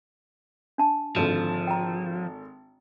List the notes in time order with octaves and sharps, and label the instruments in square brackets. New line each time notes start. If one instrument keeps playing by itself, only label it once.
[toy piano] D4 A5
[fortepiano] G#1 D3 [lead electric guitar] F3
[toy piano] G5 A#5